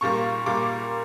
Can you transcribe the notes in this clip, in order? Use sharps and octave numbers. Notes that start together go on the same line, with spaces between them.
A#2 G3 A#3 C#6
A#2 G3 A#3 D6